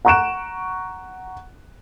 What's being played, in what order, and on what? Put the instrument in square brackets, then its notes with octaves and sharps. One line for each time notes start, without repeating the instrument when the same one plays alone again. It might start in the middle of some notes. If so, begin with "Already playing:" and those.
[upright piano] F#5 A#5 C#6 F#6 D7 E7